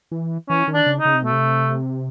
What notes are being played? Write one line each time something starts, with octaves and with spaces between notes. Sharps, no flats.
E3
E3 C#4
D#3
D4
C#3
D#4
C#3
C3
B2 A3
C3